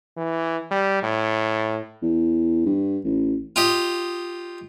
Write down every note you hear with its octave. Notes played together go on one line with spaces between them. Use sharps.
E3
G3
A2
E2
G2
A1
F4 G4 D#5